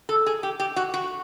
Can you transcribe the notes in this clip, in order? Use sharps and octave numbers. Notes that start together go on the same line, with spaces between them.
A4
G#4
G4
G4
F#4
F#4